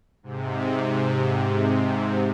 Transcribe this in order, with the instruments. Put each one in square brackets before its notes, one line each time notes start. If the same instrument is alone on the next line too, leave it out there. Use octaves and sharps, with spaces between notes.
[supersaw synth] G#2 C3